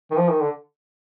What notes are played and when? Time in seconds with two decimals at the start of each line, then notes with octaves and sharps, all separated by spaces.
0.11 D#3
0.17 F3
0.29 D#3
0.41 D3